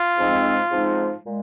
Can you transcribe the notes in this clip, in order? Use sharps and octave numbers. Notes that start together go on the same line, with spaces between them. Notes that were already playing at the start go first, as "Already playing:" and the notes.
Already playing: F4
G#2 F3 G#3 C4 D#4
G#2 F3 G#3 C4 D#4
A#2 G#3